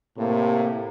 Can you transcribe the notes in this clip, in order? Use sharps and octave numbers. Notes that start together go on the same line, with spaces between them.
A2 C3 A#3